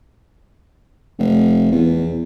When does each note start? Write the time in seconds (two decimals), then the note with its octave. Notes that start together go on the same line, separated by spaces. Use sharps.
1.19 F1
1.71 E2